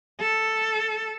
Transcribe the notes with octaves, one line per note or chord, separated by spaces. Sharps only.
A4